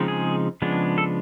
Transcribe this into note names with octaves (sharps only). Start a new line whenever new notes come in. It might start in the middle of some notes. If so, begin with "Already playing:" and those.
Already playing: C#3 F3 G#3 C4 D#4
G#4
C#3 F3 G#3 B3 D4
A4